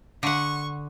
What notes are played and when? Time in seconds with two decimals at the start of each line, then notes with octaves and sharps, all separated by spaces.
0.23 D3 F#5 C#6